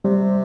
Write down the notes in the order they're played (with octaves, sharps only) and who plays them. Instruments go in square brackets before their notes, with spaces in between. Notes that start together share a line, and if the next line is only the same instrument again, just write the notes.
[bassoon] C3 [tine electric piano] G3